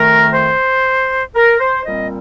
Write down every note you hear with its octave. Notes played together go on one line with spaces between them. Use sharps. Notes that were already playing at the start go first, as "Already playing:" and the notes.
Already playing: F2 D#3 A3 A#4
C5
A#4
C5
A#2 G3 C4 D#5